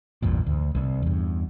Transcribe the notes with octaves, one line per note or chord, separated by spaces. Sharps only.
A1 E2 G2 A#2
D2
C2
E2 G2